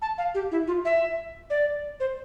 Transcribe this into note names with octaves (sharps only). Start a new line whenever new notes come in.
A5
F5
G4
E4
F4
E5
D5
C5